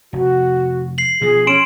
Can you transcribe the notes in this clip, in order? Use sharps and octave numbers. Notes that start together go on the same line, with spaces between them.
F1 F#4
C7 F#7
B2 F3 G#4
C#4 C6 D7 E7